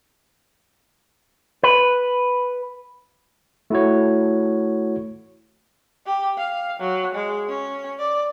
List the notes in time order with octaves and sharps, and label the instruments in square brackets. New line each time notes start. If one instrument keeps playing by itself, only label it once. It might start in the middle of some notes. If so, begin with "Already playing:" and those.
[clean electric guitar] B4
[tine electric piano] A3 E4 F#4 C#5
[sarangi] G4
F5
F#3
G#3
C#4
D5